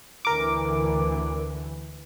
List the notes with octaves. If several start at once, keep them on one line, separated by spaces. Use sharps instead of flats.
D2 D3 E3 A#4 D6